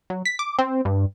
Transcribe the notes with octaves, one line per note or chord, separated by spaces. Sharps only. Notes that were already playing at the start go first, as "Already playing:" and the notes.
F#3
B6
D6
C4
G2